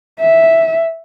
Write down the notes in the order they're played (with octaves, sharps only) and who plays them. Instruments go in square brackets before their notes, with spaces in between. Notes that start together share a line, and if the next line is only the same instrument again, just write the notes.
[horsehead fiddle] E5